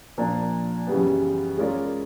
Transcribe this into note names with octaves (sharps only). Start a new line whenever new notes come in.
A#2 F3 A#3 D4
F#2 C#3 E3 G3 B3
G#3 C#4 F4 A#4 D5